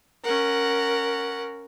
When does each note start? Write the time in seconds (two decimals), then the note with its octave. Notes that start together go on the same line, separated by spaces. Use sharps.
0.24 C#4 A#4 F#5